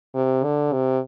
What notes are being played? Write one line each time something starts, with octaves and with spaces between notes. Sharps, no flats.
C3
D3
C3